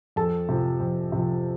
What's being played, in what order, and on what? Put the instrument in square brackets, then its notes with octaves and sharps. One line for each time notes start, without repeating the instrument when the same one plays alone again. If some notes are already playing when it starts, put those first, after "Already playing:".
[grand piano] F2 A4 A5
C3 F3
F2
C3 F3